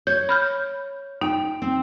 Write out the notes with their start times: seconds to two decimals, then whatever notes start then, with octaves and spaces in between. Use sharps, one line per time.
0.07 C#5 G6
0.29 B5 F6 G6
1.21 D#4 G5
1.62 C4